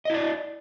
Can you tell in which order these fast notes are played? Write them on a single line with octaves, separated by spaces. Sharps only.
D#5 E4 D5